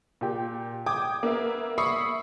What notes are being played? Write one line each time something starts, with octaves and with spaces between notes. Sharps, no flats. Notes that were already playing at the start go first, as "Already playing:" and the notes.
A#2 G4
G5 D6 D#6 G#6
A#3 B3 E5
E5 B5 C#6 D#6 C7 C#7